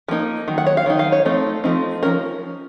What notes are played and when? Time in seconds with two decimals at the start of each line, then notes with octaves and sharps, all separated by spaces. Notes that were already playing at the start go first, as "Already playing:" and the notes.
0.08 F3 A#3 D#4
0.48 D#3 F#3
0.58 F#5
0.67 C#5
0.77 F5
0.86 D#3 F#3 D#4
0.99 F5
1.12 C#5
1.25 F3 A3 C4 D#4
1.64 F3 A3 C4 D#4
2.03 F3 A3 C#4 A#4